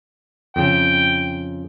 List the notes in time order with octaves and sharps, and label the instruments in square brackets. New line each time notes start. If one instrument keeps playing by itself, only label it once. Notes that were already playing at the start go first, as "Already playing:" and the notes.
[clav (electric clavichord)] F2 C#3 [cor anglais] G5